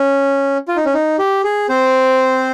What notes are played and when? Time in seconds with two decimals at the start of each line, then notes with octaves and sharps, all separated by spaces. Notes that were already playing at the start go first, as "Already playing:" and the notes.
Already playing: C#4
0.68 F4
0.76 D#4
0.85 C#4
0.94 D#4
1.19 G4
1.44 G#4
1.69 C4 C5